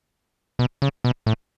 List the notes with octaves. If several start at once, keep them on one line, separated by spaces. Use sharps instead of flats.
B2
C#3
B2
A2